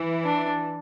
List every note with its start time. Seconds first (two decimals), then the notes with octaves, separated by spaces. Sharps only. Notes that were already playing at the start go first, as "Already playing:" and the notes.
Already playing: E3
0.24 D4